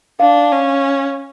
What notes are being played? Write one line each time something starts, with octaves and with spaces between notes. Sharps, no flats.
D4 F5
C#4